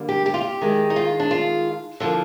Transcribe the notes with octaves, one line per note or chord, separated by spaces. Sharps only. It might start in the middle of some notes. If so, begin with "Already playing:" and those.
Already playing: D3 G3 A#3
G4
G4
F4
G4
D#3 G#3
D#4
F4
D4
F4
D3 F3 A#3